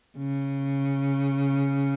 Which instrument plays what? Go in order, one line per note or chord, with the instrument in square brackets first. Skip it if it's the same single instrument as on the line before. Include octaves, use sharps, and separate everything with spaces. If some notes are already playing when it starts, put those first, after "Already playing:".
[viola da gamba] C#3